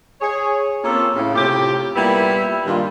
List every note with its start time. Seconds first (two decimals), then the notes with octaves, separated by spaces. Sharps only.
0.21 G#4 C#5
0.84 A#3 C4 C#4 F4 G4 A4
1.16 A2 C#3
1.35 A2 C3 C#4 F4 G4
1.96 A#2 G3 A#3 B3 E4
2.65 G2 A#2 D#3 G3 F4